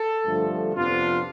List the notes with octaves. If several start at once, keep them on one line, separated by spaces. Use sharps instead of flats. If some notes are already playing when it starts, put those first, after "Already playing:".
Already playing: A4
G2 D3 F3 A3
F2 C3 F3 B3 D4 F4